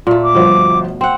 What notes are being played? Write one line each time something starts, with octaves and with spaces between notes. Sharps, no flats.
A#2 A3 F4
D6
G1 B2 F3 C5
C4 F#5